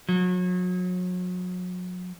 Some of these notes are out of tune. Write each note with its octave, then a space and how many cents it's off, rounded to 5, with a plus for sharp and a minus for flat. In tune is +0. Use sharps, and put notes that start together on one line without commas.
F#3 -35